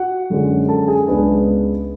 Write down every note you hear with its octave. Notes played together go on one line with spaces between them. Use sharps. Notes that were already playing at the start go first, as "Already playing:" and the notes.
Already playing: F#4 F#5
F#2 D3 G#3 C#4
A4 A5
G#4 G#5
C#2 C#3 G#3 B3 D4 B4